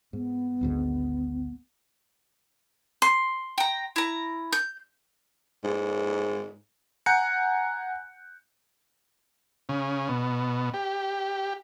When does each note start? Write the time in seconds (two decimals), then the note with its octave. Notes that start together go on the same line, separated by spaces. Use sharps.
0.13 G#2 B3
0.61 G#1 D2 G#2
3.02 C6
3.58 G5 A#5
3.96 E4 A#5
4.53 G6
5.64 G#2
7.06 F#5 G#5 A#5 F#6 G6 C#7
9.69 C#3
10.09 B2
10.74 G4